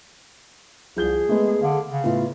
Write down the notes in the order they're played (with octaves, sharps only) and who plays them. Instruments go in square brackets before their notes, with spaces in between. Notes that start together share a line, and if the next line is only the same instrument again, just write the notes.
[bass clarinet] C2 [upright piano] F3 G6 G7 [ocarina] G#4
[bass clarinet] G#3 [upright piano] A3 B3
[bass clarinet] D3 [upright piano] F5
[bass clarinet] C#3
[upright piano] A2 B3 [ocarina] F4